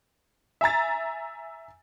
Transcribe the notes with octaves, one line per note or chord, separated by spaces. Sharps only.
E5 G#5 A#5 A6